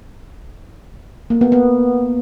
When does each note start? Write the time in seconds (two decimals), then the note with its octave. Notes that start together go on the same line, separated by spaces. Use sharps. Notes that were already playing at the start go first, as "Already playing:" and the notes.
1.30 A#3
1.41 B3
1.52 B3